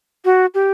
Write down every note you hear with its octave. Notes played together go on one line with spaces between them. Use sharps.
F#4
G4